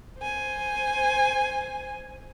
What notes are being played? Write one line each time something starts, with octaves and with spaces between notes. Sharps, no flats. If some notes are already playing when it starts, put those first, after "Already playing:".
C5 G#5